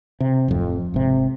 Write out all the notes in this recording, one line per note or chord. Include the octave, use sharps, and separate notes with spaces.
C3
D1 F2
G#1 C3